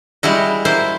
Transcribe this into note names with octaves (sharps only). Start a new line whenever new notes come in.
G3 G#3 E4 F#4
A#3 E4 C5